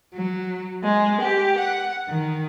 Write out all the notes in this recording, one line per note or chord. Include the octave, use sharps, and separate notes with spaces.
F#3
G#3
G4
F#5
D#3